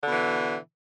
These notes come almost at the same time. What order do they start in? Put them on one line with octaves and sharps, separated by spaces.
D3 B2 E3